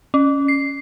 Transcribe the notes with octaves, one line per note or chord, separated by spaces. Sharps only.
C#4
C7